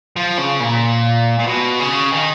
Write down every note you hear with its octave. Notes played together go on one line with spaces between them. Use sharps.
F3
C#3
A#2
A#2
B2
C#3
D#3